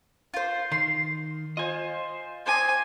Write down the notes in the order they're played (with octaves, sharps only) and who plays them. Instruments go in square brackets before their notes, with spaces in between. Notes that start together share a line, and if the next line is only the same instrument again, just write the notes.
[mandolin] F4 C5
[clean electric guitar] D#3 [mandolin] C6
[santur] F4 C5 [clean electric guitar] D#5 G#5
[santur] C5 D5 D#5 [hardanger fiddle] G#5